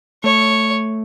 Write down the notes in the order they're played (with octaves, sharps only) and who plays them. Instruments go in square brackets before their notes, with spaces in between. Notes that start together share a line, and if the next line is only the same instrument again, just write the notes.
[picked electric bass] A3 [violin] C#5